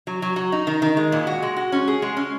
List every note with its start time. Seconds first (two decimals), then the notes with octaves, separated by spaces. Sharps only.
0.07 F#3
0.22 F#3
0.36 F#3
0.52 D#4
0.67 D#3
0.82 D#3
0.97 G#3
1.12 A#2
1.27 F#4
1.42 G#3
1.56 F#4
1.72 C#4
1.88 G#4
2.02 G#3
2.17 C#4